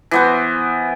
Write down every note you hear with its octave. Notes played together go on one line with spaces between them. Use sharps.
E3 B3 C5